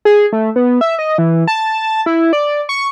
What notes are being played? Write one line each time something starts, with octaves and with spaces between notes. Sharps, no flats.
G#4
A3
B3
E5
D#5
E3
A5
E4
D5
C#6